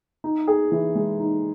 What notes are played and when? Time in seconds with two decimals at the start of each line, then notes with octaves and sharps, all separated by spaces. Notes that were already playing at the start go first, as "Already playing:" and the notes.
0.24 D#4
0.47 G#4
0.72 E3
0.95 G#3
1.20 D#4